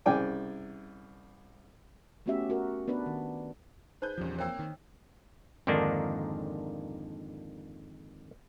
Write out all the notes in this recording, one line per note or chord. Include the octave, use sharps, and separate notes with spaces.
C2 C#3 D5 G5 G#5 D6
A3 B3 C#4 F#4 G4 E5
F#4 A#4
B3 D4 B4 D5
D#3
D#4 G#4 B4 C5 G6
E2 A#2 C#3 F3 G3
A#3 C4 C#5 G5 E6
D#3
F2 G#2 D3 D#3 A#3 D4